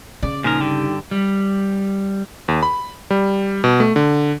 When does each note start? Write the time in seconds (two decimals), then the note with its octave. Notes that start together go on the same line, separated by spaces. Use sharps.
0.23 C#3 D5
0.44 A#2 F3 D#4 G#4 A#4
0.61 G2 D3 G4
1.11 G3
2.48 D#2
2.63 B5
3.10 G3
3.64 B2
3.80 A3
3.96 D3